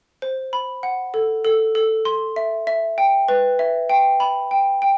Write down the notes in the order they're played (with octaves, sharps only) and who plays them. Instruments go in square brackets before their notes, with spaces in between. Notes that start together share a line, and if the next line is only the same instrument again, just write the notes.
[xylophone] C5
B5
F#5
A4
A4
A4
C6
E5
E5
G5
B4
E5
G5
B5
G5
G5